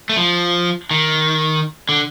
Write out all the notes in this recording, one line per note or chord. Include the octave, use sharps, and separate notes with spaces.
A3
F3
D#3
D3